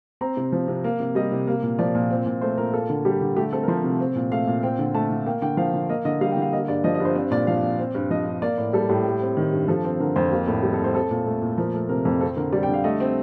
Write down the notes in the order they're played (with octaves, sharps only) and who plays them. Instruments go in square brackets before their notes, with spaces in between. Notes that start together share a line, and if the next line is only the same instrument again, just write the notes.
[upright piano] C4 A#5
C3
F3
C3
A#3
C3
G3 D#5
C3
A#3
A#2
F3 D5
A#2
C4
A#2
A3 C5
A#2 A#4
A#3 A4
D3
G3 G4
D3
A3 G4
C4 A4
A#4
F3 C5
C3
C4
A#2
A3 F5
A#2
C4 G5
D3
A3 A5
D3
A#3 G5
D3 G5
F3 F5
D3
A#3 D#5
D3 D#5
G3 F5
G5
D3
F5
A#3 D#5
G2 D5
F3 D#5
D#5
G2
C5
C4 D5
A#2 D5
F3 F5
A#2
C4
G2
F3 D#5
G2
A#3 D5
A2
G3 A4
A2 G4
G3
C4
D#3
G2
F3 A4
C4
D3 A#4
F2 C5
A#3 G4
A2 A4
G3
A4
A2
C5
C4 A4
A#2
A3
A#2
F3 A#4
A3
C3 A#4
F2 A4
C4 A4
D3 A#4
G3 D5
G5
D3
F5
A3 D#5
C4